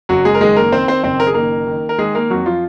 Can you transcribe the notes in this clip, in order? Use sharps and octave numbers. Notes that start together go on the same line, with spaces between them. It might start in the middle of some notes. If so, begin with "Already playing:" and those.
F#1 F#3 F#4
G#3 G#4
A#4
D#3 G#3 G#4
A#3 A#4
D#3 C4 C5
C4 C5
F#1 C4 C5
A#4
G#4
D#3 A#3 A#4
D#3
A#4
D#3 G#3 G#4
A#3 A#4
F2 F#3 F#4
F3 F4